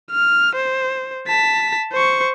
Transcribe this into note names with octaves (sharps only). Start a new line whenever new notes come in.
F6
C5
A5 B6
C5 C#6